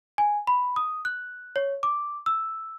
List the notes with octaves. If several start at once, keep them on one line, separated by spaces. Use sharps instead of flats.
G#5
B5
D#6
F#6
C#5
D6
E6